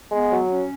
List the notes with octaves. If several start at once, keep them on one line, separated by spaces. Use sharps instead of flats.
G#3 B3
F#3
C#4